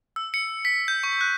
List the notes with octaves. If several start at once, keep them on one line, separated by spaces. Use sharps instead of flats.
E6
C#7
B6
G6
C#6
F#6